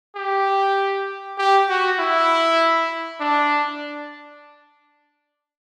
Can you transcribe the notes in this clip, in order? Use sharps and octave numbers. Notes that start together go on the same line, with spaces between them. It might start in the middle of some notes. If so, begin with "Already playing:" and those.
G4
G4
F#4
E4
D4